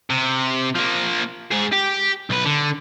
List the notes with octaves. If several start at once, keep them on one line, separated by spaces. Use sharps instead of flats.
C3
F3 A#3
G#2 G#4
G4
B1 B4
D3